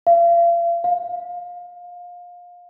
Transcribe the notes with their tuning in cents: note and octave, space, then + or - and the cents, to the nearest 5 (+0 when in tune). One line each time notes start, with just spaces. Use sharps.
F5 -40
F5 +25